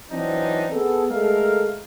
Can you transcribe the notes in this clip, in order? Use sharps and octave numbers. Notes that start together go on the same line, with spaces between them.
E3 F#3 C4 D4 D#4
B3 G#4 A4
G#3 A3 A4 A#4 F5